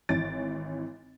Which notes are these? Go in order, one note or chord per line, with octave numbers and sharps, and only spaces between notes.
G#1 E3 C#5 A6 D7